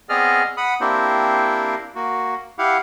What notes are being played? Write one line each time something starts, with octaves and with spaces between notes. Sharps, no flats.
B3 C4 G#4 D5 D#5 F6
F#5 B5 D#6
A#3 C4 D4 E4 G4 C5
A#3 F#4
E4 G4 F5 F#5